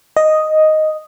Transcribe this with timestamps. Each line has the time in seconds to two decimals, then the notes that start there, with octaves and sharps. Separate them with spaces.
0.17 D#5